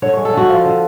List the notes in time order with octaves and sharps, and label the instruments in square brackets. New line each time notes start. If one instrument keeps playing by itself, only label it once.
[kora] D3 C#5
G#3 C#5
A4
D3 F#4
F3 F4
D3